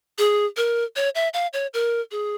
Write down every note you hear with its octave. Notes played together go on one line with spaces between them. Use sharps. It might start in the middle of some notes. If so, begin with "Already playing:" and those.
G#4
A#4
C#5
E5
F5
C#5
A#4
G#4